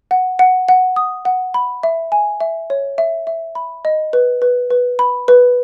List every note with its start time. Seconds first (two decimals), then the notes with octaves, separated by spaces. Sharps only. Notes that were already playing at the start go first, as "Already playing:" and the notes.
0.11 F#5
0.39 F#5
0.69 F#5
0.96 D#6
1.25 F#5
1.54 B5
1.83 E5
2.12 G#5
2.41 E5
2.70 C#5
2.98 E5
3.27 E5
3.55 B5
3.85 D#5
4.13 B4
4.42 B4
4.70 B4
4.99 B5
5.28 B4